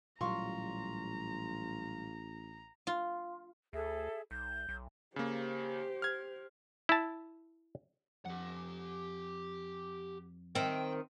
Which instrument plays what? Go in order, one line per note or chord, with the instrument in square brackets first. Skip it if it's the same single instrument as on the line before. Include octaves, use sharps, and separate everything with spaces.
[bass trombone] A1 [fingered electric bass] A#2 F#3 G3 [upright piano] F4 C6 C#6 [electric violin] A#5
[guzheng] F4
[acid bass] D2 [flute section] G#4 A4 E5
[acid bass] B1 [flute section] G6
[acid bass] B1
[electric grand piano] C#3 A#3 [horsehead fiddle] G4 C5
[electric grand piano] F6 G#6
[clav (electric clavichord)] E4 A5
[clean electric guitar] F2 [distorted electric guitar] G4 F#5
[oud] D#3 C4 [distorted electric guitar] G5